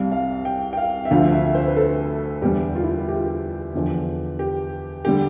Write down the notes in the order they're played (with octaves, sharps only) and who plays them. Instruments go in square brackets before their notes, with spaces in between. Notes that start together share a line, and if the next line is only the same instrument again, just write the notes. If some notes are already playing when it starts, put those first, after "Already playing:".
Already playing: [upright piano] C2 C3 G3 F5
F5
G5
G5
F5
E5
D2 D3 F3 F5
E5
C5
B4
A4
E2 D3 G3 G4
F4
E4
E4
G4
F4
G4
E2 D3 F3
G4
D3 G3 G4